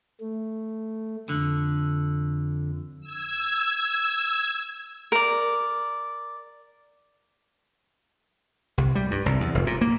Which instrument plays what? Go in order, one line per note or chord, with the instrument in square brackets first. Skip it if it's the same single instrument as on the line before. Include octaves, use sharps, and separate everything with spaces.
[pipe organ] A3
[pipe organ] F2 [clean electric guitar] D3
[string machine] E6 G#6
[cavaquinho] A#4 D5
[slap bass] C2
G3
G2
C2
E2
F1
A#2
A#3